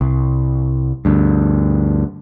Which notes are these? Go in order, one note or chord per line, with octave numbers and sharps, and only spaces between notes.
C2
D2 G2